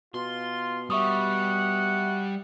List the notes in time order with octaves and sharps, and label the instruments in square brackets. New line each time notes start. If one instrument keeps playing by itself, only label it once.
[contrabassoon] B2 [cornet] F4 [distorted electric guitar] C6
[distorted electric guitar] G3 [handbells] E5 C#6 D#6 [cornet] F#5